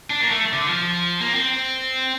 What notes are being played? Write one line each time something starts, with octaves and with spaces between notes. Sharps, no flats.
D4
A#3
A3
D3
F3
A#3
C4